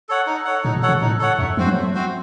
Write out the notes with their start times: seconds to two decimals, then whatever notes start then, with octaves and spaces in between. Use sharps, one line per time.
0.09 A4 C#5 F#5
0.27 D#4
0.45 A4 C#5 F#5
0.64 A2 D#4
0.76 A#2
0.83 A4 C#5 F#5
0.89 C3
1.01 A2 D#4
1.19 A4 C#5 F#5
1.38 F2 A3
1.57 F3 C4 F#4 C5
1.66 F#3
1.76 A3
1.94 C4 F#4 C5